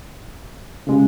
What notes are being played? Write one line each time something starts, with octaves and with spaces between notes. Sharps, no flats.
C#3 G#3